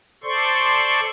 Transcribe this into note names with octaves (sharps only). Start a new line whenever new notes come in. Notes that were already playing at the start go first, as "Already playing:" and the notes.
A4 C5 D5 C6 C#6